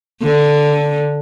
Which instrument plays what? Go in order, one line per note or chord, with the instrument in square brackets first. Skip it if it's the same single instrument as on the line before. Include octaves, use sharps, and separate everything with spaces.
[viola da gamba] D3